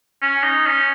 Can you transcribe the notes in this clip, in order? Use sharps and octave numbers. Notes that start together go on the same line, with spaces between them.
C#4
D#4
C#4